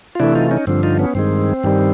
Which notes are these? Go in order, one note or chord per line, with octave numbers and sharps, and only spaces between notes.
F4
C3 E3 A3 D4 E4
D#4 F4
C#4 D#4
G2 D3 F3 C4
D#4 F4
B3 C#4
G2 D#3 G#3 C4
G2 D#3 G3